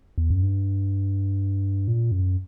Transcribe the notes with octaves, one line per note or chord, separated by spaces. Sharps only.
E2
F#2
G2
A#2
F#2